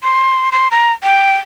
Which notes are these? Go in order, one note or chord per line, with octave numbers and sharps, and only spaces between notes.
C6
C6
A#5
G5